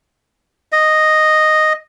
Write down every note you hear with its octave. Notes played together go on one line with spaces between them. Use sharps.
D#5